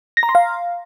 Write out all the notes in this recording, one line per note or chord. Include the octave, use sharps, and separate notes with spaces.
A#6
A#5
C6
F5